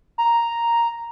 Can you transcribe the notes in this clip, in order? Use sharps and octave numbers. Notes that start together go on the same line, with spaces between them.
A#5